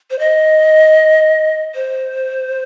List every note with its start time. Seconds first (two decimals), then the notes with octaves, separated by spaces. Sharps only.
0.11 C5
0.19 D#5
1.75 C5